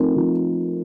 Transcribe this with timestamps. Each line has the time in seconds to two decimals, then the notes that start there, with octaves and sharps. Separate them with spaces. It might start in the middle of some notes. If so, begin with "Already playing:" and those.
Already playing: F3 A3 C4 D#4 A#4
0.17 F3